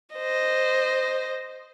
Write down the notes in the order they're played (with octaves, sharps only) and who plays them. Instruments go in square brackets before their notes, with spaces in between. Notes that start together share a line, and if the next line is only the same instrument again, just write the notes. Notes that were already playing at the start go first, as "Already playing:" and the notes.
[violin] C5 D#5